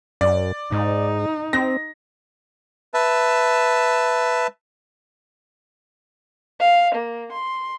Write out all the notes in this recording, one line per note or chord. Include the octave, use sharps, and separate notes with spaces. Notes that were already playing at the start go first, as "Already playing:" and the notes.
F#2 D5
G#2 D#4
C4 A#6
B4 E5 A5
F5
A#3
C6